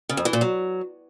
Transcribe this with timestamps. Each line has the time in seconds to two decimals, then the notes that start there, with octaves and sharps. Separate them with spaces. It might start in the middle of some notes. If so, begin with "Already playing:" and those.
0.09 C#3
0.17 F2
0.25 E3
0.33 A#2
0.41 F#3